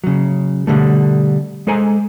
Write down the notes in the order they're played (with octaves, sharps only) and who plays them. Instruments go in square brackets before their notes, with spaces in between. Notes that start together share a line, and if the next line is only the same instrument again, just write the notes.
[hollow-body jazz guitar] C#3 F#3
B2 D3 G3 A3
G#3 A4 C5 G#5 A#5